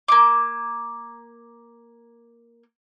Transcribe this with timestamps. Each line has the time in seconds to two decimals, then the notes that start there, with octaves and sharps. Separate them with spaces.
0.08 A#3 D6